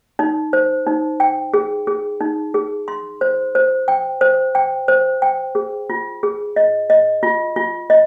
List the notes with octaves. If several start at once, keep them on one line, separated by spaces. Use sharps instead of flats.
D#4
C5
D#4
G5
G#4
G#4
D#4
G#4
C6
C5
C5
G5
C5
G5
C5
G5
G#4
F4
G#4
D#5
D#5
F4
F4
D#5